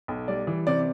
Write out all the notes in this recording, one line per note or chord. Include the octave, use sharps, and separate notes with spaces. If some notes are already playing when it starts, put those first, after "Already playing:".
B1
G3 D5
E3
C3 D5